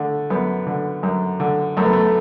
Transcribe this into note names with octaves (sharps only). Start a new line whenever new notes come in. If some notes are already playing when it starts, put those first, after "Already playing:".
Already playing: D3 A3
F#2 B3
D3
F#2
D3
F#2 A3
B3
A3